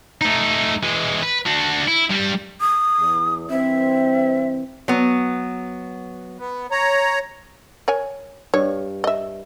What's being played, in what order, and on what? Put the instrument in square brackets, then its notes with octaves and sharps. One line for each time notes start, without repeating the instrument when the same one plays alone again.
[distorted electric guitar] A3 D#4
E3 G#3
B4
D4 F#4
E4
G2 G3
[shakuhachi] D#6
[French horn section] E2
[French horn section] G2 E3 C4 [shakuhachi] E5
[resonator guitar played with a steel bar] F#3 B3
[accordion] B3
C#5 A#5
[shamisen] A#4 C#5 G#5
[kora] G2 [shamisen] C#5
[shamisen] D#5 E5